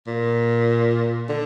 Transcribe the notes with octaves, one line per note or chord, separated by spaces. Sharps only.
A#2
D3